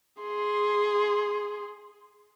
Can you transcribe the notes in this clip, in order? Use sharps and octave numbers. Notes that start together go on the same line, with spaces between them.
G#4 C6